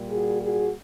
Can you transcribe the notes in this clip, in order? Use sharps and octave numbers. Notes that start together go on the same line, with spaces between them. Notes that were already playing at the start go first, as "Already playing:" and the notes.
Already playing: A#2 G3
F#4 G#4
F#4 G#4